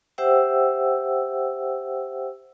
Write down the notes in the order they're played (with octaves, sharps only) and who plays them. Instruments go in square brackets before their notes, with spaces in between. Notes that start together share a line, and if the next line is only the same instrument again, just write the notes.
[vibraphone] G4 C5 E5 F#5 G5 E6